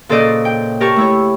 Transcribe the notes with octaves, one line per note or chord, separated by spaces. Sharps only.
A#2 C#3 A4 C5 D5 D#5
G5
G4 A#4 A5 C#6
A3 E4 C#5